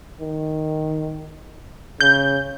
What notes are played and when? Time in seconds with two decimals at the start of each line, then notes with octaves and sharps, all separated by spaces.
0.20 D#3
2.01 C#3 G6